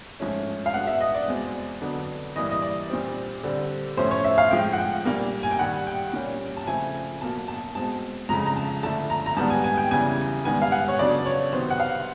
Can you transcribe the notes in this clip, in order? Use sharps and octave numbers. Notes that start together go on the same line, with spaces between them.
G#2 F3 A3 C#4
F5
B2 G#3 B3 D4 F#5
E5
D#5
D5
E2 B2 G#3 C4
F2 D3 F#3 B3 D4
G2 E3 G3 A#3 D#5
D#5
D5
A#2 G3 C4
D3 G3 C4
A2 F3 A3 C#4 C5
C#5
E5
F5
A2 F3 G#3 G5
F#5
G5
A#2 G3 A#3
G#5
G5
G2 D#3 G3 F#5
G5
A#2 G3 A#3 C#4
A5
C#3 F3 A3 C4 G#5
B2 F#3 A#3 A5
A5
B2 G#3 C4 A5
F2 C#3 F3 G#3 A#5
A#5
A5
D3 F3 A3 D4 A5
A#5
A#5
G#2 D#3 G3 B3 A5
G#5
G#5
G5
E2 C#3 E3 G3 G#5
G#2 D#3 G3 B3 G#5
F5
F#5
C#5
F2 C#3 F#3 B3 D4 D5
C#5
C3 D#3 F#3 B3 C5
F#5
F5